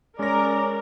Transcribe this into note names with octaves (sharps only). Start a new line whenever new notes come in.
G#3 C#4 A#4 D5 A#6